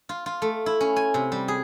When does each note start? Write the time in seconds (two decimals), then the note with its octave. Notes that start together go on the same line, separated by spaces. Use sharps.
0.09 F4
0.26 F4
0.42 A3
0.66 E4
0.81 C#4
0.96 G#5
1.14 C3
1.32 G3
1.48 G#4